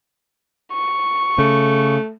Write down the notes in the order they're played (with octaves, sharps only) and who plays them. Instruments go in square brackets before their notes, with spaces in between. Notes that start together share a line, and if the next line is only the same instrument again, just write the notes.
[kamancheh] C#6
[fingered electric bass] C#3 [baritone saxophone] A3